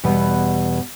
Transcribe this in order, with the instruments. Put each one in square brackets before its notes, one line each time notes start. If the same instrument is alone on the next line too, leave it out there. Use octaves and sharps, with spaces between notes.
[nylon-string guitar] E2 B2 G3 B3